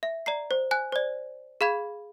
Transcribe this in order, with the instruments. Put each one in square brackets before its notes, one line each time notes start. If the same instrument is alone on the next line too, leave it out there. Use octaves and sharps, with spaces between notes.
[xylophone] E5
D5 A#5 C7
C5
G#5 F#6
C5 D5
G#4 F5 B5 G#6